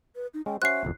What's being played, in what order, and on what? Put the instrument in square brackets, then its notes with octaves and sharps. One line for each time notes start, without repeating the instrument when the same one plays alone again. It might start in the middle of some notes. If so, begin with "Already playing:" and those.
[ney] B4
D#4
[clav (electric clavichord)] G#3 C#4 [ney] G5
[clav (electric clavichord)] C#4 F#4 C5 [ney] E5 [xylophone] F#6 C7
[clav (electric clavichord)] G1 C2 F2